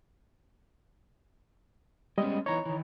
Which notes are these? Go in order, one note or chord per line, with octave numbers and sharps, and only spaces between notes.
G3 G#3 B3 C#4 D#5
E3 B3 D#4 C#5 A#5
D#3 E3